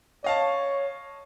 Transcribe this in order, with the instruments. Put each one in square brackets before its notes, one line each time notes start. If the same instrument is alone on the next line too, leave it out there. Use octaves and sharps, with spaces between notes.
[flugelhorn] C#5 [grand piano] D#5 F5 A5